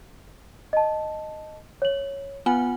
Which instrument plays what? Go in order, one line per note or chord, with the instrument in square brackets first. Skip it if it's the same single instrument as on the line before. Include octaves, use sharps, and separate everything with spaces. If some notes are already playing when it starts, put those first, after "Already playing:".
[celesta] D#5 A5
C#5 F#7
[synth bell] B3 F4 F#5 [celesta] G#5